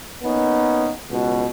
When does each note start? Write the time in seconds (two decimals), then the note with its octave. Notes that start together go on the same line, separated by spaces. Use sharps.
0.23 A#3 B3 C#4 D#4
1.10 C#2 B2